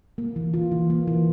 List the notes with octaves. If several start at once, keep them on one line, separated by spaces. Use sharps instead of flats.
A#3
E3
F4
E3
A#3
E3